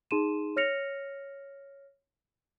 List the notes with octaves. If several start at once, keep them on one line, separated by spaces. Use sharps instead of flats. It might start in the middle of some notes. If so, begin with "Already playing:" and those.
D#4 G#4 C6 D#7 E7
C#5 F6 A#6 C#7 F7